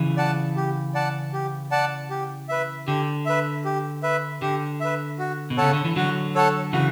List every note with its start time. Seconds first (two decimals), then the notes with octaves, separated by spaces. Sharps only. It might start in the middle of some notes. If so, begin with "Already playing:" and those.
Already playing: C#3 E3
0.17 D5 F#5 A5
0.56 G4
0.95 D5 F#5 A5
1.33 G4
1.71 D5 F#5 A5
2.10 G4
2.49 B4 E5
2.87 D3 G4
3.26 B4 E5
3.65 G4
4.03 B4 E5
4.42 D3 G4
4.80 B4 E5
5.19 F#4
5.50 B2
5.57 C#3 A4 C#5 F#5 A5
5.73 D3
5.85 E3
5.96 D3 F#3 F#4
6.35 A4 C#5 F#5 A5
6.73 C#3 E3 F#4